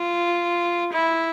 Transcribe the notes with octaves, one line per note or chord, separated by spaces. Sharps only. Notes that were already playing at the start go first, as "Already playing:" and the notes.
Already playing: F4
E4